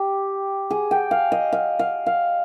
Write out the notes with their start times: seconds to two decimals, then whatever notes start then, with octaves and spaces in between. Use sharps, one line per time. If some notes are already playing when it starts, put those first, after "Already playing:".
Already playing: G4
0.70 G#4
0.91 G5
1.11 F5
1.32 D#5
1.53 F5
1.79 F5
2.06 F5